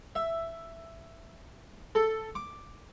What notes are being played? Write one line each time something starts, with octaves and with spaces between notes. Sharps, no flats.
E5
A4
D6